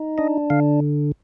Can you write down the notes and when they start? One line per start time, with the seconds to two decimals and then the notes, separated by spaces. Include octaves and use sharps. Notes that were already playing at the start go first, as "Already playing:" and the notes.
Already playing: D#4
0.18 D4 D#5
0.50 D3 F5